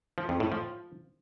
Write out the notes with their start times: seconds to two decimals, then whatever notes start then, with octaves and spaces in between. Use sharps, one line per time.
0.18 F3
0.29 F2
0.40 A2
0.52 F3